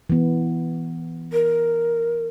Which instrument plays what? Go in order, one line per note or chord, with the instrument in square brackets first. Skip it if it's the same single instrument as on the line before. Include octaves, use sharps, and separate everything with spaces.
[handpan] E3 B3
[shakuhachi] A#4